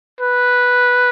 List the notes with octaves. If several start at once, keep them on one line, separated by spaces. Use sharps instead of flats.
B4